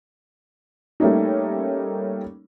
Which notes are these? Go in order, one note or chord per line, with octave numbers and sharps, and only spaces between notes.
G3 A3 A#3 C#4 D#4